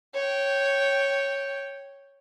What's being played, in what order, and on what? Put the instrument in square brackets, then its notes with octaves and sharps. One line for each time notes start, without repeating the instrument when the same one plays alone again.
[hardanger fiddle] C#5 G5